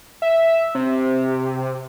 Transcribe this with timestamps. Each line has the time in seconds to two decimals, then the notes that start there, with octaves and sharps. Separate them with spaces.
0.22 E5
0.75 C3